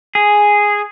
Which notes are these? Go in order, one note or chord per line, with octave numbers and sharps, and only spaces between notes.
G#4